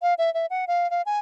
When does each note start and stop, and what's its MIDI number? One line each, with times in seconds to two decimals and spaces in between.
0.02 0.14 77
0.18 0.32 76
0.34 0.46 76
0.50 0.65 78
0.67 0.90 77
0.91 1.02 77
1.06 1.19 80